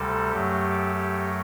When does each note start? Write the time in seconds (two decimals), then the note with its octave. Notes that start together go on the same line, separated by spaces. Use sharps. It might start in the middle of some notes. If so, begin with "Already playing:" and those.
Already playing: D2 C3 G3 A4
0.31 F#2 F#3 A3 G4
0.95 G4